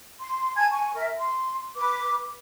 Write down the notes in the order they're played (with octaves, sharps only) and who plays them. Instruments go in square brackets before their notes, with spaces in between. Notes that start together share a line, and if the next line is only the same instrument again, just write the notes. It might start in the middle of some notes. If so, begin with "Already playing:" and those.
[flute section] C6
G#5 A5 G#6
G#5 C#6
A#4 E5
C6
B4 D6